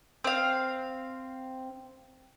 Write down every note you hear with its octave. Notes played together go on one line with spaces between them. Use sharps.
C4 F5